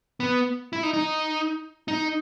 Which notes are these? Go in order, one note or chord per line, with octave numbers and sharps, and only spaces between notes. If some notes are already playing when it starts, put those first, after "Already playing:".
B3
E4
D#4
D#4
D#4